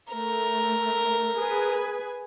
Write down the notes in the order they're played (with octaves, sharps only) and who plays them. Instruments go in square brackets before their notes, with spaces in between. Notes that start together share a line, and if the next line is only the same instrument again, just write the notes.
[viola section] A3 [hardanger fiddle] A#4
[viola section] G#4 B4 G#5